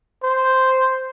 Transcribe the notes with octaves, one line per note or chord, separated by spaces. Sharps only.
C5